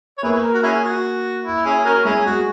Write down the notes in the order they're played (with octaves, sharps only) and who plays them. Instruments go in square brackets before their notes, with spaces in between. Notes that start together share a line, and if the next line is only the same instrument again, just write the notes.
[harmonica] C#5
[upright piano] A#3 [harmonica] E4 G#4 B4
[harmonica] A#4
F#4
C#4 E4 G#4
F#4
E4
C#4 E4 G#4
C#4 F#4 A#4
[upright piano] G#3 [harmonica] C#4 E4 G#4
[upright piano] G#3 [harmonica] F#4